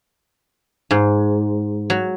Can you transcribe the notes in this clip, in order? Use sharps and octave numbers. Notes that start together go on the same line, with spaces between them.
G#2
F#3